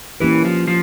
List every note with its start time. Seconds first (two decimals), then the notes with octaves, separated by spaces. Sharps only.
0.20 E3 A#3 C#4 E4 G4 B4
0.45 F3
0.67 F3